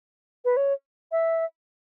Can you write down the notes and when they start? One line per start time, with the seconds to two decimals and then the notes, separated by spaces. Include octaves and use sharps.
0.45 B4
0.57 C#5
1.12 E5